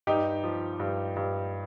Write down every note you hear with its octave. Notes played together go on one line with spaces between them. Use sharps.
G2 D#4 G4
F3
G2
G2